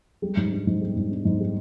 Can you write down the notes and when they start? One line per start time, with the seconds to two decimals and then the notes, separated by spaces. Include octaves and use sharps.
0.22 G3
0.37 G#2
0.52 D4
0.67 G#2
0.81 G3
0.96 G#2
1.11 D4
1.25 G#2
1.40 G3